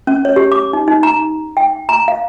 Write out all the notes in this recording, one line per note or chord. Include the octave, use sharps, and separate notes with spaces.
C#4
C#5
G4
D6
D#4
D#4
A#5
G5
A#5
F5